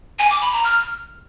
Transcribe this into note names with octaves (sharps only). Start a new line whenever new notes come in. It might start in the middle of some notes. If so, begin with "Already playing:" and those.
G#5
D6
B5
A#5
F6